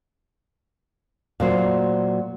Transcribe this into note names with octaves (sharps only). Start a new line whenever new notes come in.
A#2 F#3 C5